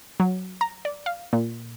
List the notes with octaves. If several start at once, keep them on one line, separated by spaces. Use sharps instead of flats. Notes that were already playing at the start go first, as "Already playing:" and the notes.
F#3
A#5
D5
F5
A#2